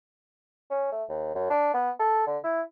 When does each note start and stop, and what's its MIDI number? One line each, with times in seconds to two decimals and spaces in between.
0.70 0.89 61
0.92 1.04 57
1.09 1.33 39
1.35 1.45 42
1.50 1.72 62
1.74 1.91 59
1.99 2.26 69
2.27 2.38 50
2.44 2.61 64